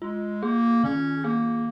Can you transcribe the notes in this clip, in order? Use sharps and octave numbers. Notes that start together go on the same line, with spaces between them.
G#3 F4
A#3 G#4
D#3 C#4
A#3 G#4